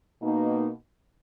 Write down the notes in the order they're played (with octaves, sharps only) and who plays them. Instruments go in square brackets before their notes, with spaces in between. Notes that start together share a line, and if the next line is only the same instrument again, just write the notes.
[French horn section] B2 A#3 D#4